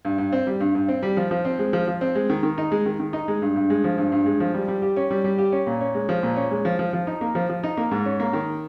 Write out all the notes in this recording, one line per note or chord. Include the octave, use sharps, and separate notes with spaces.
G2
G2
C4
G3
G2
G2
C4
G3
F3
F3
C4
G#3
F3
F3
C4
G#3
D#3
D#3
D#4
G#3
D#3
D#3
D#4
G#3
G2
G2
G#3
F3
G2
G2
G#3
F3
G3
G3
G4
C#4
G3
G3
G4
C#4
A#2
C#4
G#3
F3
A#2
C#4
G#3
F3
F3
F3
D#4
A#3
F3
F3
D#4
A#3
G#2
C#4
A#3
D#3